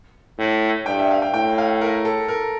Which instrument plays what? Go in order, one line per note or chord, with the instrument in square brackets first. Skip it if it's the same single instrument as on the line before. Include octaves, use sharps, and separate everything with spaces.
[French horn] A2
[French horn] G2 [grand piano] G5
[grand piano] E5
F5
G5
[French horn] A2 [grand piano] G5
[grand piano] F5
A#4
A4
A#4